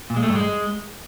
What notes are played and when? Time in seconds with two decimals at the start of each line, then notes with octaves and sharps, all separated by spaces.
0.10 A#2
0.16 G#3
0.23 A3
0.29 G2
0.36 G#3